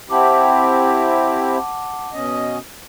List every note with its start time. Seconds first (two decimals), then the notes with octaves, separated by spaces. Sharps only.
0.10 C4 E4 G4 F#5 A5 D6
2.13 B2 C#4 D#5